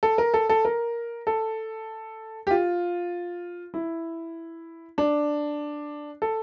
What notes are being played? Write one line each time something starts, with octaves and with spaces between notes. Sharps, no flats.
A4
A#4
A4
A4
A#4
A4
G4
F4
E4
D4
A4